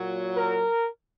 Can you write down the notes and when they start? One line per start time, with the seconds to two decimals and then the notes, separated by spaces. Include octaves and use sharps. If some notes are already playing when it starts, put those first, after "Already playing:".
Already playing: A#2 F#3
0.36 A#4